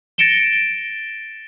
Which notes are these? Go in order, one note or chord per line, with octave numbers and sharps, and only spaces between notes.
A6 A#6 C#7 D7 E7 G7